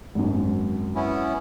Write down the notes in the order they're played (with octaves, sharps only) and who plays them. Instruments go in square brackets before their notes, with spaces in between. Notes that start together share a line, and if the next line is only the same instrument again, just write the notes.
[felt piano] G#1 F#2
[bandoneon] B3 C#4 E4